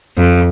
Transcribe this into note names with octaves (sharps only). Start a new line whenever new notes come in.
F2